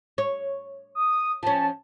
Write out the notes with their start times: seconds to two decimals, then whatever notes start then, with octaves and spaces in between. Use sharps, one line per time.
0.18 C#5
0.95 D#6
1.43 F3 C#4 A5